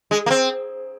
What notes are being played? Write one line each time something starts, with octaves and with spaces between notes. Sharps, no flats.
G#3
A#3
C4